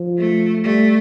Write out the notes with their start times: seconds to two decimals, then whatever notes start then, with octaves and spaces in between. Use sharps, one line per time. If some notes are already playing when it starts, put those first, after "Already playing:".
Already playing: F3
0.18 A3
0.64 G3 A3